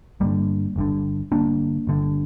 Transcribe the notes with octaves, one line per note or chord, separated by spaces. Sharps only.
G1 G2 D3 G3 A#3
G1 G2 D3
G1 G2 D3 A#3 D4
G1 G2 D3